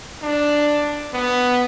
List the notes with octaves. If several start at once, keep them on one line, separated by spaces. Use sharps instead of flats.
D4
B3